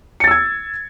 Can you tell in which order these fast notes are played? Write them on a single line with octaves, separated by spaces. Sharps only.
C#7 A6 E6 G#6